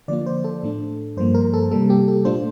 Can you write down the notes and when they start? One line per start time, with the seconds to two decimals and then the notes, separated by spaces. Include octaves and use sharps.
0.08 D3 F3 A#3 F4 D5
0.26 C5
0.44 A4
0.63 A2 A3 D4
1.17 G2 F3 A#3 C5
1.35 A#4
1.54 A4
1.71 C3 G3 A#3 A4
1.90 G4
2.08 A4
2.25 A#2 A3 D4 F4 C5